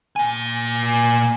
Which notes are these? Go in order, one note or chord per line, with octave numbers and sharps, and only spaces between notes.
A#2 G#5